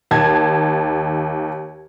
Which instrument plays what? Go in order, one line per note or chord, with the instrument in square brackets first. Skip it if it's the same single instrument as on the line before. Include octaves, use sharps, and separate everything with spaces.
[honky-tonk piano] D#2 A5 G#6